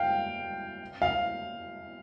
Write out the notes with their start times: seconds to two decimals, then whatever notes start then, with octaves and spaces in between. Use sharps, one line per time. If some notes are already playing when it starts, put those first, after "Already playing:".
Already playing: F5 G5
1.02 F5